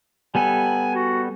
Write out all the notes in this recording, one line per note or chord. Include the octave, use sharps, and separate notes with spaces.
G3 B3 A4 G#5
F#4